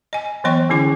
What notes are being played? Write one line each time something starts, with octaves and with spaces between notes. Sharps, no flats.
D#5 G#5
E3 F#3 B3 D#5 G5 C#6
D3 D#3 C#4 E4 D6